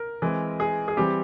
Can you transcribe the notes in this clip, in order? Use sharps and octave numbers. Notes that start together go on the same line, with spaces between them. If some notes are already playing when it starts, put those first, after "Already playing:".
Already playing: A#4
E3 G#3 C4
G#4
G#4
E3 G3 C4 G4